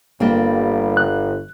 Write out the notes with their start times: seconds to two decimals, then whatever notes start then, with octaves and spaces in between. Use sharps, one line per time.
0.20 G1 G3 A#3 C4
0.97 F#6